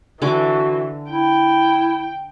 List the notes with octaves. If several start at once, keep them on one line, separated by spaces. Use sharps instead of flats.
D3 E3 F#4 G#5 D6
E4 G5